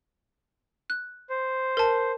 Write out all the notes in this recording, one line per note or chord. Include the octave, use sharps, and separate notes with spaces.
F#6
C5
A#4 A5